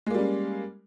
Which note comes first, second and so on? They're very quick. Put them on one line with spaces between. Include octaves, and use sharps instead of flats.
G#3 A#3 G3 C#4